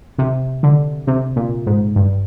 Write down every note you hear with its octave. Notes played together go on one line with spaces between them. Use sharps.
C3
D3
C3
A#2
G#2
G2